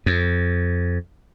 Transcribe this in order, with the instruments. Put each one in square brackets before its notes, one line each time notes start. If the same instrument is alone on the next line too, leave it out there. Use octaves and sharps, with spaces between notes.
[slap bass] F2